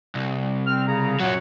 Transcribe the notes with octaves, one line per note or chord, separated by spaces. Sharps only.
C2
C4 F6
C#3 A#5
F#2 A#2 F#3 C#5 F#5